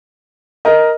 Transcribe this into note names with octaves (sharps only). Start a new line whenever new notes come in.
A#4 D#5